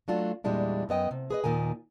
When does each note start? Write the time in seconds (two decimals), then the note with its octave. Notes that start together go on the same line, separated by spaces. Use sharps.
0.08 F#3 A3 D4 F4 F#4
0.44 E2 A#2 G3 G#3 D4 E4
0.89 F#2 B3 D#5 G5
1.11 C3
1.30 G#4 B4 D#5
1.44 D#2 A#2 D#3 A#4 G#5